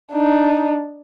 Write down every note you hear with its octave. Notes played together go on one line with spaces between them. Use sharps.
D4 D#4